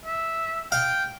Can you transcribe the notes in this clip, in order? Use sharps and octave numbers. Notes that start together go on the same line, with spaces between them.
E5
F5 G5